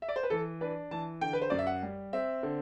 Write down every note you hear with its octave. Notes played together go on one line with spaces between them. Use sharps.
E5
D5
C5
B4
E3 A4
D4 B4
E3 A5
D3 G5
B4
C5
F#2 D5
E5
F#5
G3
C4 E5
D3